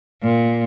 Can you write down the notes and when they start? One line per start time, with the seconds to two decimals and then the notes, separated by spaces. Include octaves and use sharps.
0.23 A#2